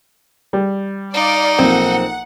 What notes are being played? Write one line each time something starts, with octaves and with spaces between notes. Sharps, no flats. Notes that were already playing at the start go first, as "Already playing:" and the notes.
G3
D#4 D5 F5
B1 F3 A#3 C4 F#5